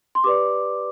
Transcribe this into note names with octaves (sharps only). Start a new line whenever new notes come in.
C6
G4 B4 D5 D6